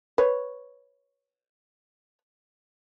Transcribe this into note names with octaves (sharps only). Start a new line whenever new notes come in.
B4 C#5